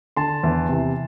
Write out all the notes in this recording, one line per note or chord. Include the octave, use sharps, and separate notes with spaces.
D3 A5 C6
E2
C3 E3